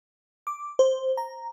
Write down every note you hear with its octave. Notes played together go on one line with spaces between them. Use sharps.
D6
C5
A#5